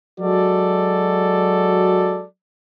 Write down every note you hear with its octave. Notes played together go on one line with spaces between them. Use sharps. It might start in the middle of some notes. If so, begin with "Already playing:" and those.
F#3 G#3 F#4 A4 D5